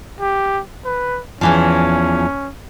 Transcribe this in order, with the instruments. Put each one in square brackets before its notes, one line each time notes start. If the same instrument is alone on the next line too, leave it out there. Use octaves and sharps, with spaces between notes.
[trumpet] G4
B4
[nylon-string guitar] E2 E3 F3 [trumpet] C#4